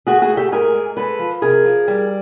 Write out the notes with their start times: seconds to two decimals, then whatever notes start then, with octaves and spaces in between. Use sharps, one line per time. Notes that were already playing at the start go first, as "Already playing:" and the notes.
0.07 A3 F#4 G#4
0.22 F#4 G#4
0.30 A3
0.37 G4 A4
0.52 G#2 G#4 A#4
0.74 G#2
0.97 G#3 A4 B4
1.19 F3
1.42 C3 G#4 A#4
1.65 F3
1.88 G3